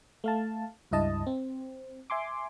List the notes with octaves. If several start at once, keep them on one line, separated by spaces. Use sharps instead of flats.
A3 F5 A5
C#2 G2 E4 D#5 A5
C4
E5 G#5 C6 D6